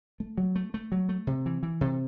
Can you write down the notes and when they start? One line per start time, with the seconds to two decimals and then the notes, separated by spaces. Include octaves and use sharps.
0.20 A3
0.38 F#3
0.55 A3
0.74 A3
0.92 F#3
1.09 A3
1.27 C3
1.46 E3
1.63 E3
1.81 C3